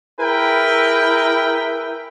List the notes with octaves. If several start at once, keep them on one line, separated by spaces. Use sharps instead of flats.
E4 G#4 A#4 B4 G5